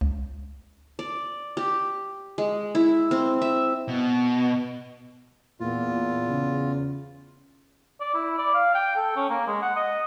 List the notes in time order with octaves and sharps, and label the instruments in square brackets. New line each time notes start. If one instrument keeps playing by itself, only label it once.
[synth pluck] C#2
[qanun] D5
G4
G#3
E4
C4
E5
[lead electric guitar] B2
[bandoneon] E2 F4 [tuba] A#2
[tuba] C#3
[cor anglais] D5
E4
D5
F5
G5
A4
C#4
A#3
G#3
F#5
D#5